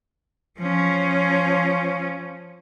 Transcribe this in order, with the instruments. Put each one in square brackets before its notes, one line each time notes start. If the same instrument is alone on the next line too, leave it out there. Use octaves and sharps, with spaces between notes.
[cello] F3 C#4